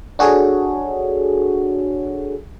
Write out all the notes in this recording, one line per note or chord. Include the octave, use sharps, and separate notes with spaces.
D4 F#4 G#4 A4 C#5